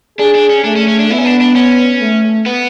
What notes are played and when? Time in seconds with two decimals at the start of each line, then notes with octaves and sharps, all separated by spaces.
0.19 D4 G#4
0.35 D4
0.50 C#4
0.64 A3 D4
0.76 C#4
0.87 C#4
0.99 D4
1.10 B3 E4
1.18 C#4
1.25 D4
1.41 D4
1.55 C#4
2.01 A3
2.46 B3